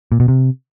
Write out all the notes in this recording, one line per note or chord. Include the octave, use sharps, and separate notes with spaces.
A#2
B2
C3